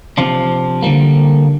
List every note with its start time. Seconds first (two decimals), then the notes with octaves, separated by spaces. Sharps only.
0.18 C3 F3 D4 F4
0.82 D3 G3 A#3